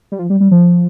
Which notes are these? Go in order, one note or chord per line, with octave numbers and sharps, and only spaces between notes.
G3
F3
G3
G3
F3